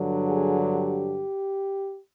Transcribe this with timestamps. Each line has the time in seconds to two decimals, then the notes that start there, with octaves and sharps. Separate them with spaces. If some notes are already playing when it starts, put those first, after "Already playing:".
Already playing: G2 D3 F#3
0.27 G#4
0.72 G4